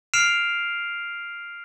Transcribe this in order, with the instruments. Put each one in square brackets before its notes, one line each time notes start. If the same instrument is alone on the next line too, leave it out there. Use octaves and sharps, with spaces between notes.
[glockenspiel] F6 C7 D7 E7 F7